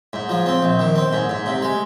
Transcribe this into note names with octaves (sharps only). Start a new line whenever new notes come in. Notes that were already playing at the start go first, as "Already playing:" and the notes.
G#2
F3
C4
A#1
D#3
C4
G#2
G#2
C3
G#3